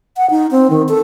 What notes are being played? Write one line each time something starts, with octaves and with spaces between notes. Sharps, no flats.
F#5
D#4
C4
D#3
A4